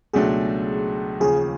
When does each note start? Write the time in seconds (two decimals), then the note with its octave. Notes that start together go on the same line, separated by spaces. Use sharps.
0.14 C#2 B2 F#3 A3 D4 G#4
1.20 D#2 C#3 F3 G#4